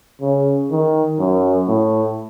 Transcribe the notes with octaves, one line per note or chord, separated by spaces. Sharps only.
C#3
D#3
F#2
A2